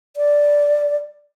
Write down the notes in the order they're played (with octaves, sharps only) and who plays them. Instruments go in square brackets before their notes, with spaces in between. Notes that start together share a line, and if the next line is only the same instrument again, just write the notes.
[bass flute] D5